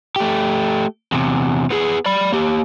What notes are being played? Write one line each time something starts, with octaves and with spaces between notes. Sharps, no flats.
A3 G4
E2 C3
B3 G#4
D5 B5
A#3 G4